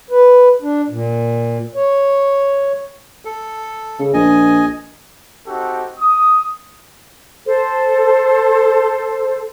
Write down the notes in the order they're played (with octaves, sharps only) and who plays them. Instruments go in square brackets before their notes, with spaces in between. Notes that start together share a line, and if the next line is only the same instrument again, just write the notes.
[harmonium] B4
D4
A#2
C#5
[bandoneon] A4
[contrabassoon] C#3
[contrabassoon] A#1 [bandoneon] D#5 G#5
[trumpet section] C4 D#4 F#4 G4 A4
D#6
[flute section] A4 C5